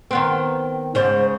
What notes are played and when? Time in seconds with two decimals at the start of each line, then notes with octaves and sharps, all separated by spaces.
0.11 D#3 B3 C4
0.95 G#2 C#3 C5